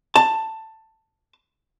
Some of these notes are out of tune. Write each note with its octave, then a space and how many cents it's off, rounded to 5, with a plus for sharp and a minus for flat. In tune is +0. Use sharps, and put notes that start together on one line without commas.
A5 +10